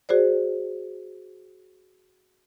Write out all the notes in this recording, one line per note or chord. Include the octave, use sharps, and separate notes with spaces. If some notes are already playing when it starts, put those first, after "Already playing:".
F#4 G#4 C5 D5